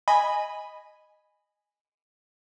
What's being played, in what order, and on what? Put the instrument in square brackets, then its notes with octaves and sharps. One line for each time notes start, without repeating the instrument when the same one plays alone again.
[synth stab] D#5 G#5 B5